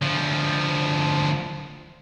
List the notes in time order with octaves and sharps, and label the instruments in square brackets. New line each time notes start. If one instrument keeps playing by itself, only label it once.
[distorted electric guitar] D2 F3